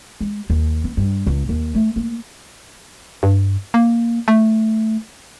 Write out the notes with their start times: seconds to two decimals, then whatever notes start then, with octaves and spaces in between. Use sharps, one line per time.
0.21 G#3
0.50 D#2
0.84 B3
0.97 G2
1.27 C#2
1.49 D#2
1.75 A3
1.96 A#3
3.23 G2
3.74 A#3
4.28 A3